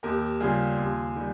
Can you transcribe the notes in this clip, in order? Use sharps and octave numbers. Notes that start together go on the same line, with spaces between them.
D#2 G4 A#4
C#3 G3 F4 G#4
D#2
D#3 G3